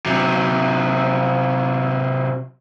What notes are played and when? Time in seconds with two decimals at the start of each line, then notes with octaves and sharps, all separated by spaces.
0.06 C3 F#3